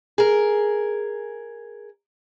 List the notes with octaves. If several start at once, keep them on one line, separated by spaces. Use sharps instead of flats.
G#4 A#4